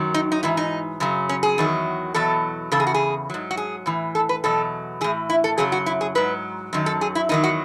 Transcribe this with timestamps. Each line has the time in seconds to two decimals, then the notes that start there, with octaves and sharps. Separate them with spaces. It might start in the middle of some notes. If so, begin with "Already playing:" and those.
Already playing: F#2 D#3 F#3
0.14 D#4
0.32 D#4
0.43 G#2 E3 E4
0.57 D#4
1.00 F#2 C#3 F#3
1.29 C#4
1.43 G#4
1.58 E2 D#3 F#3
2.14 E2 B2 F#3 A4
2.72 E2 C#3 A4
2.80 G#4
2.87 F#4
2.94 G#4
3.30 G#2 F#3
3.51 F#4
3.57 G#4
3.86 A2 E3
4.15 A4
4.29 B4
4.44 E2 B2 F#3 A4
5.01 A2 E3 G#4
5.30 E4
5.44 A4
5.58 F#2 C#3 F#3 G#4
5.72 F#4
5.86 E4
6.01 G#4
6.15 G#2 F#3 B4
6.73 F#2 D#3 F#3
6.86 A4
7.01 G#4
7.15 E4
7.29 E2 D#3 F#3 D#4
7.44 F#4